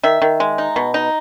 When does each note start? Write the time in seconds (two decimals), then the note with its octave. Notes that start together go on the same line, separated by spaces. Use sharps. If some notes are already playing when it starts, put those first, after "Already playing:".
0.03 D#3 E5
0.22 D#3
0.40 G#3
0.58 D#4
0.76 B2
0.94 D#4